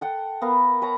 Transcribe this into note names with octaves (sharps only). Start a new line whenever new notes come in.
A4 F#5 G5
B3 A#4 F5
B4 C#5 A5 A#5